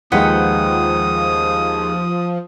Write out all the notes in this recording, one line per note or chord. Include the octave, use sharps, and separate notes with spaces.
D#2 F3 G#3 D#4 B4 F#5 G5 D#6